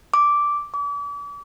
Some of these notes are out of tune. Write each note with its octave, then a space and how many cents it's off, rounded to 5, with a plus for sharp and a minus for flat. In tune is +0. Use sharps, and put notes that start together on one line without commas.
D6 -5
D6 -40